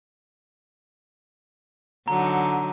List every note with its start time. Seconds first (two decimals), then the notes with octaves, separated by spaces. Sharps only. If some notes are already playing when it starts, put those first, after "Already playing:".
2.08 D3 F#3 D#4 A#5